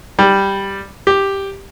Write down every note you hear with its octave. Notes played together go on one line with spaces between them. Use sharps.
G3
G4